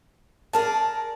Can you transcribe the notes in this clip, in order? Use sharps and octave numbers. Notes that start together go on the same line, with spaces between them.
G#4 A#4 D5 A5